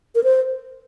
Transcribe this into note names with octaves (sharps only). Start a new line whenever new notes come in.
A#4
C5